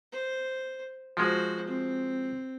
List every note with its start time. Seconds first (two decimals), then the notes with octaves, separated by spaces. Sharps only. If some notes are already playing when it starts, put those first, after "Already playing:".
0.12 C5
1.17 F3 G#3 F#4 C5
1.67 C4